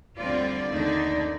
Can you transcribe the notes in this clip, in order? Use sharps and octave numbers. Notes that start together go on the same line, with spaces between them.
D2 D3 G3 C4 F4 D5
D#2 D3 A3 D#4